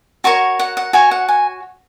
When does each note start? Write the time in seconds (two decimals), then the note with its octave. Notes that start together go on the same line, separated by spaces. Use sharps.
0.24 F#4 A#4 C#5 C#6
0.59 F#5
0.77 F#5
0.93 F#4 C#5 G#5
1.11 F#5
1.28 G#5